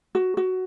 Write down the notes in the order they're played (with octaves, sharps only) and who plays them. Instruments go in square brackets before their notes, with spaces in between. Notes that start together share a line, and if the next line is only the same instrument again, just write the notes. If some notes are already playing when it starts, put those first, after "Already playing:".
[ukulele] F#4
F#4